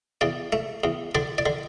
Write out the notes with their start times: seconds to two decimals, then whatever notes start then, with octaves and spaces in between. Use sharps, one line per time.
0.21 E2 D5
0.53 A3
0.84 E2
1.15 D3 D5
1.38 D5
1.46 D3